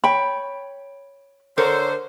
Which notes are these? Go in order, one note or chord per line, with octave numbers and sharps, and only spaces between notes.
C#5 G5 B5
D3 A4 A#4 C5 C#5